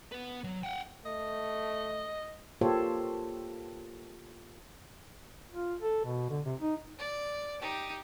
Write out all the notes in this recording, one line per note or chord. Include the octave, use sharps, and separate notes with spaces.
B3 B4
F#3
F#5 G5
A3 D#5
A#3 F4 G4 A4 C5 C#5
F4
A4
B2
D3
C3
D#4
D5
D#4 G4